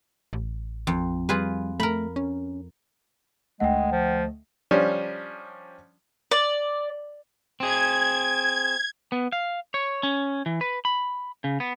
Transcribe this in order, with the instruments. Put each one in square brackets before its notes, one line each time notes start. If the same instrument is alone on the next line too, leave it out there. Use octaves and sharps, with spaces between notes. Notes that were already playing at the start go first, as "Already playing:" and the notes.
[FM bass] A1
[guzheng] F2
[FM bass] G3 [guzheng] F4 G#4 B4
[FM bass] A3 [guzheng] A#4 B5
[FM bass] C#4
[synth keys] D2 A3 D#5 [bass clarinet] G#3 [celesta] F#5 G5
[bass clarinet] F3
[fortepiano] F3 G3 C#4 D4
[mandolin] D5
[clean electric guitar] C4 G#4 [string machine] G#6
[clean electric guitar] B3
F5
C#5
C#4
E3
B4
B5
C#3
B3